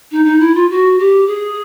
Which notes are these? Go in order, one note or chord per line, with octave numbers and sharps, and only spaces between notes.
D#4
D#4
E4
F4
F#4
G4
G#4